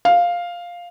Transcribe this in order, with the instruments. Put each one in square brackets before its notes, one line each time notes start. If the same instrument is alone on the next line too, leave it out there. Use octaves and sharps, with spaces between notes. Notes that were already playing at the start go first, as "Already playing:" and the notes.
[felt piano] F5